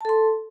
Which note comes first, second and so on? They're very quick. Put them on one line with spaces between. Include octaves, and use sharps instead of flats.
A5 A4 C6